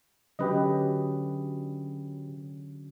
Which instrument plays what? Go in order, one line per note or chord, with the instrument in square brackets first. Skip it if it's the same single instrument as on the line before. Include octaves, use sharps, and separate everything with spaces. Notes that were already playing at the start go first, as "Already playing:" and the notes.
[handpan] D3 F#3 C#4 [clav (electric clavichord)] G4 B4 D#5